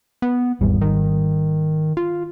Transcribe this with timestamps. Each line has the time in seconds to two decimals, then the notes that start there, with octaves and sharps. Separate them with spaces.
0.22 B3
0.61 G#1 E2 G3
0.81 D#3
1.97 F4